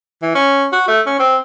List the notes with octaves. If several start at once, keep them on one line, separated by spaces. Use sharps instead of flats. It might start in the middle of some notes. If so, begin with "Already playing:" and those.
E3
C#4
F#4
A3
C#4
C4